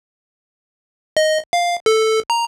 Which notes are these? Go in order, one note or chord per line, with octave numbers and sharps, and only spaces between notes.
D#5
F5
A4
A#5